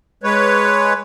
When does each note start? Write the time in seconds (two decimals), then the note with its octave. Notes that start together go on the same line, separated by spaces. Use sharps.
0.23 G#3 B4 C#5